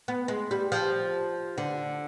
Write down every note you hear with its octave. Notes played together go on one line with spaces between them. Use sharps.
B3
G#3
G3
F3
D3